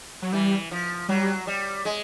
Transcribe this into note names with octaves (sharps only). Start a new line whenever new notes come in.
F#3
E3 G3
F3
F#3 G3
G3
G#3